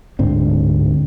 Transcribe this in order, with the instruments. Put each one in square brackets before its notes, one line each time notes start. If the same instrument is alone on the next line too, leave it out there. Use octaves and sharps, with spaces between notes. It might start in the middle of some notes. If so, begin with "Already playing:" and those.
[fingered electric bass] D1 G#2 D3 C4